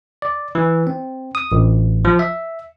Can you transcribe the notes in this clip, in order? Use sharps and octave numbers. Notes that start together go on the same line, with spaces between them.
D5
E3
C4
D#6
A1
F3
E5